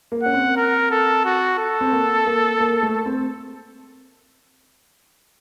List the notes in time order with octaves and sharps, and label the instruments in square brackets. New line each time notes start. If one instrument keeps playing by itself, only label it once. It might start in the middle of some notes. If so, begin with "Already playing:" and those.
[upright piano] A#3
[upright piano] C#4 [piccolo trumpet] F#5
[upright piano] C4
[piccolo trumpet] A#4
A4
F#4
A4
[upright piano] C4
A#3
A#3
A#3
A3
C4